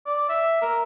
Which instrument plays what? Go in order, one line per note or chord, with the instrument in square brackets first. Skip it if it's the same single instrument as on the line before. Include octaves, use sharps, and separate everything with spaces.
[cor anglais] D5
E5
A#4